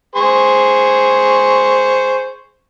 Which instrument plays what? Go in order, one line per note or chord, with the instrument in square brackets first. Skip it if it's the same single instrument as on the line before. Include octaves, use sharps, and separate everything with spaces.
[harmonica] G#4 C5 C#6